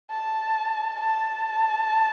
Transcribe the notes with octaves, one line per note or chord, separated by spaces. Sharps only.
A5
A5